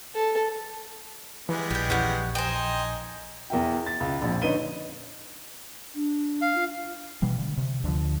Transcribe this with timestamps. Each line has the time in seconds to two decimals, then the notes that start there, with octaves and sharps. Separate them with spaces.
0.15 A4
1.49 E3 G3 G#3 B3
1.71 A#1 G4 G5
1.90 E2 C#4 G4 F#5
2.35 D#4 C5 D#5 G5 G#5
3.50 E2 A#4 E5 G5
3.86 A6
4.00 C#2
4.22 A#1 F2
4.42 D3 D#4 B4 C#5 D#7 G7
5.95 D4
6.42 F5
6.55 F4
7.22 B2 E3 G3
7.38 D3
7.57 C3
7.84 D2 D3 D#3 F3